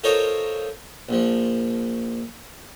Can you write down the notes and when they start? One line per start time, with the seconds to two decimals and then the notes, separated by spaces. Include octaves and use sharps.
0.04 F4 A4 A#4 C5 C#5 D#5
1.09 A#1 F3